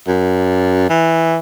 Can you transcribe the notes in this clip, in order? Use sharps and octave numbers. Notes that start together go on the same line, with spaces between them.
F#2
E3